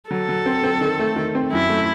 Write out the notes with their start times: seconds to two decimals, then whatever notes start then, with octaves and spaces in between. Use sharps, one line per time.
0.10 F#3 A4
0.29 F#3
0.46 C4
0.64 C4
0.81 D#3
0.99 A3
1.16 D#3
1.35 C4
1.53 F#2 E4
1.70 A3